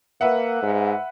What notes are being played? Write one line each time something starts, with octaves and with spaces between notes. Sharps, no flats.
A#3 B4 E5 F#5
G#2